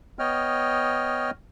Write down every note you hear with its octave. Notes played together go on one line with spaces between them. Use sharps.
B3 C#5 D#5 G5 F6